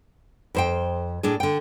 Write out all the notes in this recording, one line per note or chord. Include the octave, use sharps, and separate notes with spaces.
F2 C5 G5
A2 D4 G#4
D3 G5